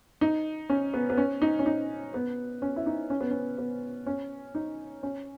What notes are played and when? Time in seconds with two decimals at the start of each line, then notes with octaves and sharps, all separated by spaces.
0.21 D#4
0.69 C#4
0.94 B3
1.10 B3
1.17 C#4
1.42 D#4
1.59 C#4
1.66 D#4
2.14 B3
2.62 C#4
2.76 E4
2.86 D#4
3.10 C#4
3.21 B3
3.31 C#4
3.58 B3
4.07 C#4
4.55 D#4
5.03 C#4